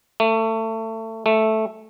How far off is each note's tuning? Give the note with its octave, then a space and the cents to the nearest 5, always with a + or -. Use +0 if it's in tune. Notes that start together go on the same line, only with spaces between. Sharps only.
A3 +25
A3 -5